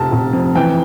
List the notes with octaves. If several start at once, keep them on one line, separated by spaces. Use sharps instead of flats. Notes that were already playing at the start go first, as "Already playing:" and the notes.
Already playing: F1 C3 A5
F1
F2
E3 G5